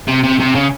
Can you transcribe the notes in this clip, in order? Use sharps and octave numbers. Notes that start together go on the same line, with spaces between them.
C3
C3
C3
C#3